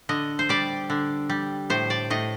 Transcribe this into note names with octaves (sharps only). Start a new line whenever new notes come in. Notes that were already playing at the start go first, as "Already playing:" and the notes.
D3 D#5
C5
G3 D5
D3
G3
A2 C5
D5
A2 D#5